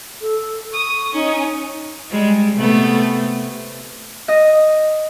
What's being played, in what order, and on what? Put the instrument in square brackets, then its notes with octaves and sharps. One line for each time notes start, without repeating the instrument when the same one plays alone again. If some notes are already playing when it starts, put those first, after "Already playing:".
[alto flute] A4
[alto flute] C#6 [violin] D#6
[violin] C#4 [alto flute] D#4
[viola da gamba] G3 G#3
C3 A3 B3
[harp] D#5